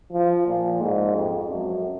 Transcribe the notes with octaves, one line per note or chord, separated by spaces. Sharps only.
F3
A#2
G#2
F2
F#2